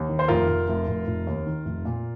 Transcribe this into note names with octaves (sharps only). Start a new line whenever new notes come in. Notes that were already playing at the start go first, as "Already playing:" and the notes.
Already playing: D#2
D#3
C5
F1 F4 A#4
F1
F1
F1
F1
D#2
D#3
F1
A#2